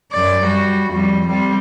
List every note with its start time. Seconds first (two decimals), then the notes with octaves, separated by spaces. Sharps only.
0.12 F#2 D5
0.45 G3 F#4
0.90 F2 G3
1.28 G3 C4